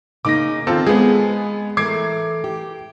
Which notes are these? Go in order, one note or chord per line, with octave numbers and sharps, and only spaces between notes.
C#3 A#3 D#4 D6 A#6
D#3 C4 F4 A4
G#3 B3 G#4
E3 A3 A#4 D6 G#6 C7
G4